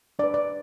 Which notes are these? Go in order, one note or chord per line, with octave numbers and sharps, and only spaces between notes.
D4 B4 D5
D5